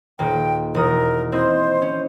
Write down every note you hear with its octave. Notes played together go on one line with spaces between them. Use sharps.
D#1 A#3 G5
E1 A#4 D#6
C4 E4 C5 D#5
C#4